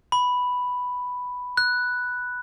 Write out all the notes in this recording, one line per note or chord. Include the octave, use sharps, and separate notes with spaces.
B5
F#6